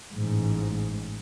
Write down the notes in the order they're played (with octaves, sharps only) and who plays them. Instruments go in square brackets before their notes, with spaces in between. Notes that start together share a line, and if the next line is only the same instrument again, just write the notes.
[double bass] A1 G#2